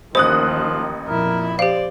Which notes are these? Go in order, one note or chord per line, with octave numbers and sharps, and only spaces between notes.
A1 D#2 D#3 F3 C5 D#6 F#6
F2 A#2 E4 A#4
G4 C5 D5 F5